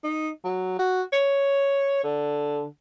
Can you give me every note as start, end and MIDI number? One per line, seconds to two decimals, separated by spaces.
0.04 0.29 63
0.44 0.75 54
0.79 1.02 66
1.13 2.00 73
2.04 2.66 50